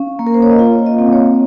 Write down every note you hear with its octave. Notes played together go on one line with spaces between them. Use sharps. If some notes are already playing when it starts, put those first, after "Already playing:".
Already playing: C#4 F5
A#3
A#4
C5
C#5
D#5
F4 F5
D#5
C4
C#5